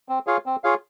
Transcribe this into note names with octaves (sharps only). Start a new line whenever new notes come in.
C4
F4 G#4 C#5 F5
C4
F4 G#4 C#5 F5